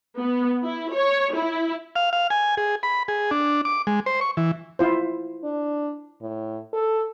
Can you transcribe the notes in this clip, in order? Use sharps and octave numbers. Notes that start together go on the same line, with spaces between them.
B3
E4
C#5
E4
F5
F5
G#5
G#4
B5
G#4
D4
D6
G#3
C5
C#6
E3
E4 F4 C5
D4
A2
A4